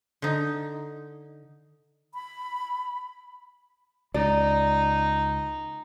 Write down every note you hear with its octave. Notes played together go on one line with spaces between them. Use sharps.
D3 D#4
B5
C#2 D#4 D5